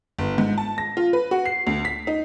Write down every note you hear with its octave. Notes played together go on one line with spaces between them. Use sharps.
G1
G#2
A5
A#6
F4
B4
F#4
C7
D2
B6
D#4